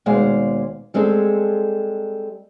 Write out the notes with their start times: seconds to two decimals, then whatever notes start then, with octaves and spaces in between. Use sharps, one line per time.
0.06 D#2 B2 G#3 C5 D5 F5
0.94 G3 G#3 C4 G#4 A4